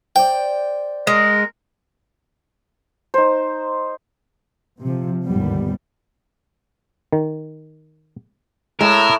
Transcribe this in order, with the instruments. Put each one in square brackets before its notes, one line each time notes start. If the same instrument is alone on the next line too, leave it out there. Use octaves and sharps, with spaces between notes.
[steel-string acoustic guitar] C5 D5 [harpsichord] G5
[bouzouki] G#3 [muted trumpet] A#4
[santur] D#4 C5
[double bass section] C3 F3
G1 D#2 G#2 G3 B3
[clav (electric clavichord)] D#3
[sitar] A2 [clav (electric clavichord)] G#3 [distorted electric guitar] A#4 [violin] E6